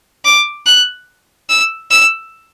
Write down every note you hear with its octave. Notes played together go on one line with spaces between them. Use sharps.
D6
F#6
E6
E6